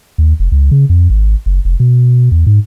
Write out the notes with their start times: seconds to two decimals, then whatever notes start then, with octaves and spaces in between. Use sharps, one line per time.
0.18 D#2
0.40 F1
0.52 C#2
0.71 C#3
0.89 F2
1.10 G#1
1.46 F#1
1.65 F1
1.80 B2
2.31 E2
2.47 G#2